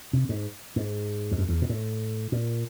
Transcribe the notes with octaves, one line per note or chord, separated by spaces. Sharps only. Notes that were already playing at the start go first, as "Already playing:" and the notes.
C3
G#2
G#2
F2
F#2
E2
A#2
A2
A#2